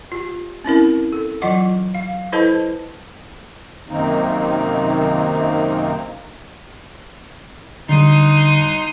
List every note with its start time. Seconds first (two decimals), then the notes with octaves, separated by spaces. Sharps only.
0.12 F4 G4
0.64 C4 C#4 E4 A#4
1.13 A4
1.42 E3 F#3 F4 D#5 F#5 D6
1.95 F5
2.32 E4 A4 B4 C5 D#5 A5
3.89 F#2 C3 D#3 A#3 C4 D#4
7.89 D3 G3 D#4 C6 D#6